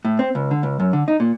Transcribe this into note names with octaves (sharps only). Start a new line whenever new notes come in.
A2
C4
C#2
D3
C#2
F#2
D3
D#4
A#2